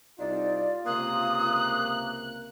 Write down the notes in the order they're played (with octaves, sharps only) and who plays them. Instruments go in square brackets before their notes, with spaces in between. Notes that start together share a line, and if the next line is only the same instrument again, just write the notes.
[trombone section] C2 C4 D#4 [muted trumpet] F4 [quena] D5
[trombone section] C#2 C3 A#3 [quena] D#6 [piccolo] F#6